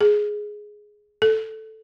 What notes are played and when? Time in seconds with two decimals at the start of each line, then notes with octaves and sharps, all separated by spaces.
0.01 G#4
1.22 A4